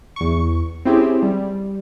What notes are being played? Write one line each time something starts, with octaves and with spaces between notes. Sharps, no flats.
E2 C#6
C4 C#4 E4 G4 G#4 C5
G3